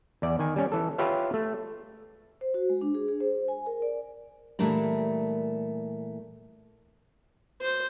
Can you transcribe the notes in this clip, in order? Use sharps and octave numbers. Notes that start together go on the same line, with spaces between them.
E2 D5
D#3 G#5
G3 C#4
E3 A4
F4 G4 B4 C#5 E5 F5
A3
C5
F#4
G#3
D4
G#4
G#4
C5
G#5
A#4
D5
A#2 E3 G3 A3 D4 A#4
C5